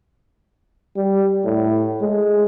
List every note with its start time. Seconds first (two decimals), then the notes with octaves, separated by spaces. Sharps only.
0.96 G3
1.45 A2
2.01 G#3